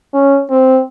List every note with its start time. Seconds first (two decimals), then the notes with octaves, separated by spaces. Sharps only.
0.13 C#4
0.51 C4